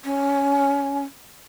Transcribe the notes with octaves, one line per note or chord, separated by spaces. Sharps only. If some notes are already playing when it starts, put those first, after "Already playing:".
C#4